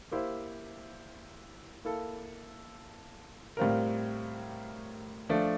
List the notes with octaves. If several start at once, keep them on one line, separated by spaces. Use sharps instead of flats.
A#3 E4 G4 C5
A#3 E4 A4
A2 G3 C4 F4 A#4
F3 A3 D4